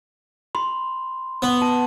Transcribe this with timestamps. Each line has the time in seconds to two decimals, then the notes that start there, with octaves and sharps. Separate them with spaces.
0.55 B5 C6
1.42 B3
1.62 A5